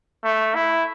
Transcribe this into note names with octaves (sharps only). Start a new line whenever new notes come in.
A3
E4